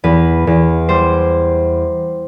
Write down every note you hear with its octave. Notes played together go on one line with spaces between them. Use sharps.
E2 B4
E2
G3 C5